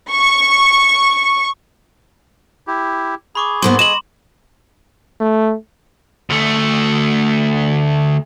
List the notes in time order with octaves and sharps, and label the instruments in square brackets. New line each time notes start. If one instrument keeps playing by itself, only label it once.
[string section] C#6
[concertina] E4 G4
[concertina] G#4 [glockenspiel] B5 C#6 D6
[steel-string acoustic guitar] G#2 A#3 B3 [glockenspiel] C6
[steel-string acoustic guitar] D#5 [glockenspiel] C6 [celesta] E7 F#7
[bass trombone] A3
[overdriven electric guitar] D2 A3